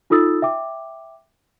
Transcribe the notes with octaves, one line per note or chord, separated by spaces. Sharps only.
D#4 F4 A4 D#6 E6 A6
E5 G5 D6